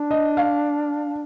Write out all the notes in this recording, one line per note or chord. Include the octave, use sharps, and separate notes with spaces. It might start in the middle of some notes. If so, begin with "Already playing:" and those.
Already playing: D4
D#5
F5